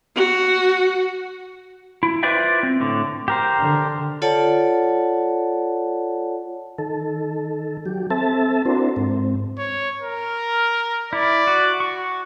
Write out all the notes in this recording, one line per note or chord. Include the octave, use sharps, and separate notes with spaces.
F#4
E4
F4 B4 C5 D5 E5 G5
C4
A2 D3
G4 A#4 C5
D3
F4 A4 C#5 D5 F#5 A5
D#3 A4
F#3 G4
C4 A4 E5 A5
C4 D4 E4 F#4 A#4 C5
G#2 C4
C#5
A#4
E4 D5
F#4
F#4 C#6